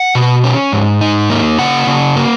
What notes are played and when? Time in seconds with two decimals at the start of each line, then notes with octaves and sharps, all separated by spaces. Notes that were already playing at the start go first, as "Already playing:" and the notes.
Already playing: F#5
0.15 B2
0.44 C#4
0.72 G#2
1.01 D#4
1.30 A#3
1.58 C#3 F#5
1.87 C#3
2.16 A#3